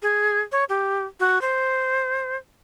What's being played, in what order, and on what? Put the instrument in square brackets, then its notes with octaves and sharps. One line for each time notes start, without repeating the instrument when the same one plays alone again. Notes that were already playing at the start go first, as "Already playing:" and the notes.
[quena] G#4
C#5
G4
F#4
C5